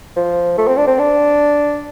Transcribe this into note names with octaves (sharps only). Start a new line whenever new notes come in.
F3
A3
C4
D4
C4
D4